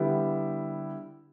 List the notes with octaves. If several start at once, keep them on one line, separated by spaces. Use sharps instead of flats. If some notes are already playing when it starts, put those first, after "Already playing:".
Already playing: D3 G3 B3 E4 G4